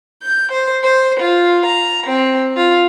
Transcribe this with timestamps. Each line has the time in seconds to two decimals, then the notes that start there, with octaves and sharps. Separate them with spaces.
0.22 G6
0.52 C5
0.84 C5
1.20 F4
1.66 A#5
2.06 C4
2.56 F4